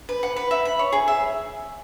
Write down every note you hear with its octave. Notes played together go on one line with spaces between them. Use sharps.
B4
F#5
B4
E5
B5
C#5
G#4
E5